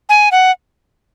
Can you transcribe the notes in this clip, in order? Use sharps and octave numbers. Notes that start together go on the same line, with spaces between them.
G#5
F#5